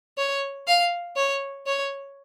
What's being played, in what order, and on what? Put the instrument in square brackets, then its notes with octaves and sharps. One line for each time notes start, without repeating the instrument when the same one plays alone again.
[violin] C#5
F5
C#5
C#5